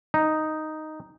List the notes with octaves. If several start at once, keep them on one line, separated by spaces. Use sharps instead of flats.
D#4